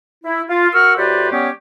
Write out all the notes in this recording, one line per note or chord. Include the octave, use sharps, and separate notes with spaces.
E4
F4
F#4 A#4 F#5 C#6 E6 F6
A2 F#4 G4 B4 C5 D5
G3 B3 C#4 G4 C#5